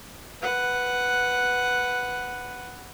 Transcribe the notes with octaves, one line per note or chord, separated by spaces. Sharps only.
B4 F#5